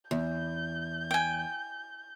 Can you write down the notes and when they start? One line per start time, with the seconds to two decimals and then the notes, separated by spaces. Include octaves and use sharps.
0.11 E2 G6
1.11 G5 G#5